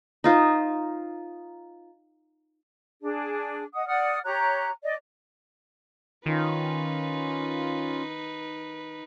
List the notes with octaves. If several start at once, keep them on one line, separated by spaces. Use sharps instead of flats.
D#4 F4 C5
D4 G#4
D#5 F#5 D#6
D5 F#5 D#6 F6
G4 C#5 A#5 F#6
D5 D#5
D#3 C#4 D#4 F4 B4